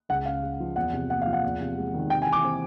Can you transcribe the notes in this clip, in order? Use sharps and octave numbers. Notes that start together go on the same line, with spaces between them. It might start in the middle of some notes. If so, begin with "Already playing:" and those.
C#2 F#5
C#3 F5
G#3
F3
E2 F#5
C3
A#3 F#5
F5
F3
F#5
E2
C3
G#3
D#3
C3 G5
G#5
E3
D6
C4